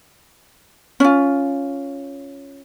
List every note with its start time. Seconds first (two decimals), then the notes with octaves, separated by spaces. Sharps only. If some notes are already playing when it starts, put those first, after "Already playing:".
1.00 C#4 F4